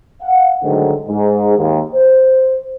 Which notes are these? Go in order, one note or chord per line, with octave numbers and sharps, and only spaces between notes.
F5 F#5
G#2 D3 D#3 F#3 A3
G#2
D#2
C5